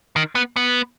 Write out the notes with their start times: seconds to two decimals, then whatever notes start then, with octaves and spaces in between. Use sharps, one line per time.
0.16 D#3
0.35 B3
0.56 B3